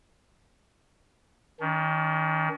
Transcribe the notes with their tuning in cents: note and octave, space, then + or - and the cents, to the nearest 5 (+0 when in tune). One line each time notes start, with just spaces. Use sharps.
D#3 +20 D4 -45